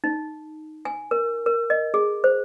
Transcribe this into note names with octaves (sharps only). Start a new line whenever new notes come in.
D#4
G#5
A#4
A#4
D#5
G#4
C5